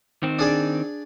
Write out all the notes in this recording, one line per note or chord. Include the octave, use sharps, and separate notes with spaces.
D#3 C4
D4 G#4 D5